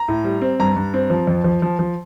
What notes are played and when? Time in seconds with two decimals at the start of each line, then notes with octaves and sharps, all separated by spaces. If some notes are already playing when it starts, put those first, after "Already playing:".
Already playing: A#5
0.08 A2
0.24 G3
0.42 C4
0.60 G2 A#5
0.76 G2
0.94 C4
1.10 F3
1.27 F2
1.44 F3
1.62 F3
1.79 F3